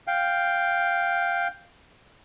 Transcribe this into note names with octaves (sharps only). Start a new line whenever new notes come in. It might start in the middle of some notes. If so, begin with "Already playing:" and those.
F5 G5